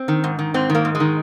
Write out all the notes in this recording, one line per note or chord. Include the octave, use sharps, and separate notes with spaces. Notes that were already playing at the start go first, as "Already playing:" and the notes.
Already playing: C4
D#3
G#2
D#3
G#2 C4
D#3
A#3
G#2
G#3
D#3